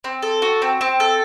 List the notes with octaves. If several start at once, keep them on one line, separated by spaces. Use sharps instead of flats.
C4
A4
F#4
C4
C4
A4